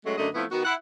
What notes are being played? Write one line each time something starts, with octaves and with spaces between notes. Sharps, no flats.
F#3 G#3 A3 C#4 F#4
F#2 D3 A3 D4 D#5
F3 A3 B3 C4 E4
D#3 B3 F#4
E4 F#5